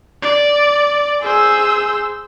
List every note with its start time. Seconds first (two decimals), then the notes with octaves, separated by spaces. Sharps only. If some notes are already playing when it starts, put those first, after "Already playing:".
0.22 D5
1.22 G#4 C5 E6